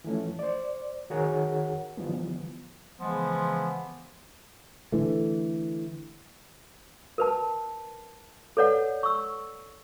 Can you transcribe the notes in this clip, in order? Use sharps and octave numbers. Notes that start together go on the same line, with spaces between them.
E3 F3 A3 C#4
C5 D5
D#3 F#4 G#4 A#4 C#5 F#5
D3 E3 F3 G3 B3
C#3 E3 F3 G#3 B3
D3 E3 A3
A#4 B4 A5
A4 B4 C#5 D5 F#5
C#6 E6